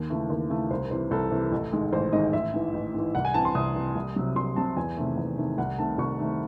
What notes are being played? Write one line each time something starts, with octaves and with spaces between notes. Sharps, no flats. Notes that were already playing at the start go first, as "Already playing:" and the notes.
Already playing: D#2
C#3 E3 A3
D#2
C#3 E3 A3
C2 C5
C3 E3 C5
C2 A4
C3 E3
A1
G#2 D#3 G#3
A1 C5
G#2 D#3 G#3 D#5
A1 E5
G#2 E3
A1
G#2 E3
C2 F#5
G#5
C3 E3 A5
C6
C2 D#6
C3 E3
C2
C3 F#3
C2 C6
C3 F#3 A5
E2 G#5
C3 D#3 A3
E2
C3 D#3 A3
C2 F#5
C3 D#3 A3 A5
C2 C#6
C3 D#3 A3